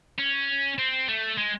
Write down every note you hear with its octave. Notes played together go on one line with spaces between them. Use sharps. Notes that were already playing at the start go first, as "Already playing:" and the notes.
C#4
C4
A3
G#3